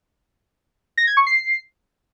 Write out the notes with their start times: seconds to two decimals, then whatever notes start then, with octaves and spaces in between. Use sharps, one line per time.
0.98 A#6
1.07 G#6
1.17 C#6
1.27 C7